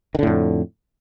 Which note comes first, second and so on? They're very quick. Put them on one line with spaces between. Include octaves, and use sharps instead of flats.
D#3 D3 A2 F2